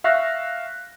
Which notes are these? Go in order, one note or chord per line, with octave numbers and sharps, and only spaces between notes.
E5 F5 C#6 F#6 A#6